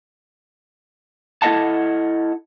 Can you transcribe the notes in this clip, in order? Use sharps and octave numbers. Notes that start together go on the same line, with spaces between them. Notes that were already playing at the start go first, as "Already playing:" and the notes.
E4 A4 C5 D#5 F#5 A5